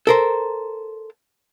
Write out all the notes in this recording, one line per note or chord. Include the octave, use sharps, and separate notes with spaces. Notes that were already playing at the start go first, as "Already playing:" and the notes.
A4 A#4 C5